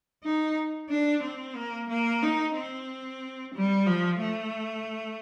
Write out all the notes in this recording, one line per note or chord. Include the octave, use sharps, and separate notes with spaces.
D#4
D4
C4
A#3
A#3
D#4
C4
G3
F3
A3